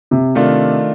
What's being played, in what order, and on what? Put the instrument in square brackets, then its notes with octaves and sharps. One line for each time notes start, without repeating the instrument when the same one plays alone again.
[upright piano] C3
[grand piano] D#3 A3 D4 F4